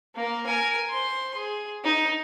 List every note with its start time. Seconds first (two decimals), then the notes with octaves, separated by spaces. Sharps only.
0.15 A#3 A#4
0.47 A#4 G#5
0.90 C5 C6
1.35 G#4
1.84 D#4